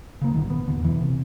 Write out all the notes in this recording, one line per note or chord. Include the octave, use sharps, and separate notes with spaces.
C#3 A#3
A#1 A2 D3 D#3
B3
E2 D3
B2 E3
C3